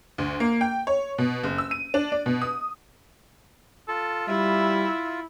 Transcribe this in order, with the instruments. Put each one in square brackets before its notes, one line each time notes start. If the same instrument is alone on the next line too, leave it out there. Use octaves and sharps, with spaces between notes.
[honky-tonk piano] D2
A#3
G5
C#5
B2
F#1
E6
D#7
D4
D5
B2
D#6
[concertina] F4 [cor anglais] A4
[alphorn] G3 [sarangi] E4 [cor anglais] E5